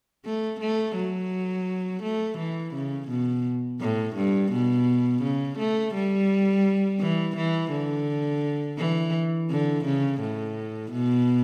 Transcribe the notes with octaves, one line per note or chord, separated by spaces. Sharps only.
A3
A3
F#3
A3
E3
C#3
B2
A2
G2
B2
C#3
A3
G3
E3
E3
D3
E3
D3
C#3
A2
B2